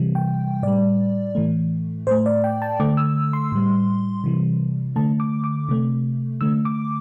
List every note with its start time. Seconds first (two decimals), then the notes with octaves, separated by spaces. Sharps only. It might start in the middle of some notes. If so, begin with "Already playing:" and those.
Already playing: C3 E3 G3
0.15 G5
0.63 A2 G3 D5
1.35 A2 E3 A3
2.07 A2 A3 C5
2.26 D5
2.44 G5
2.62 A5
2.80 D3 A3 D6
2.97 E6
3.33 C6
3.52 A2 G3
4.24 C3 E3 G3
4.96 D3 A3 A5
5.20 D6
5.44 D6
5.69 C3 A3
6.41 D3 A3 E6
6.65 D6